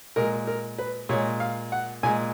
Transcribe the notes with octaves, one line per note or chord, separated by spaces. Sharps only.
A#2 G#3 A#4
A#4
B4
A#2 G#3 C#5
F5
F#5
A#2 G#3 G#5